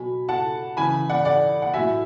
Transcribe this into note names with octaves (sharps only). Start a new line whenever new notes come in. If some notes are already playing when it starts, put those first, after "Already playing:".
Already playing: B2 F#3 G#5 B5
F#5 A5
C#3 E3 G#5 B5
D5 F#5
D5 F#5
F#5
A2 F#3 E5 G#5